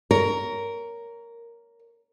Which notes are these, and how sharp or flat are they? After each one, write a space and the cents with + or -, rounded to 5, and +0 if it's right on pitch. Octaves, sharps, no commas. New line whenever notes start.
A#4 +0 C#5 +20